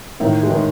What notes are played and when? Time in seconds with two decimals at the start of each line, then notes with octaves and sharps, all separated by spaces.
0.20 A2 D#3
0.43 G#3
0.50 D#3